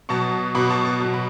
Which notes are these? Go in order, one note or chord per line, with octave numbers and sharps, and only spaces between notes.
B2 F#3 A5 C#6
B2 F#3 B5 D6
A5 C#6
A5 C#6
B2 F#3
B5